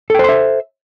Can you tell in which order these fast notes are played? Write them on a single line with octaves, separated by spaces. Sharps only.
A4 G5 C5 C6 E5